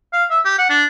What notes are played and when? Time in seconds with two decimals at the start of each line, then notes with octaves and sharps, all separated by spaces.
0.13 F5
0.30 E5
0.45 G4
0.58 F#5
0.70 D4